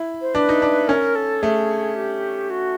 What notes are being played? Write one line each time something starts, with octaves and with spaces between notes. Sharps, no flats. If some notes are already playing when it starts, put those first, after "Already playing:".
Already playing: E4
C5
D4 B4
D#4
D4
C#4 A#4
A4
A3 G#4
G4
F#4